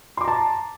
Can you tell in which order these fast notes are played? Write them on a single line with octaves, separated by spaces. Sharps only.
C6 D6 A#5 A5